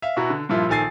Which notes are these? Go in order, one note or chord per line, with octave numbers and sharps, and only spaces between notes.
E5 F5
B2 E4 F#4 A#5
D3
G2 A#2 F3 E4 F4
A#1 D#3 A4 G#5 A6 C7